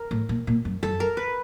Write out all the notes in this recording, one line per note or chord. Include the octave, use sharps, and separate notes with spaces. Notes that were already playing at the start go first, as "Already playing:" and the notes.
Already playing: A#4
A2
A#2
A#2
F#2
F#2 A4
A#4
B4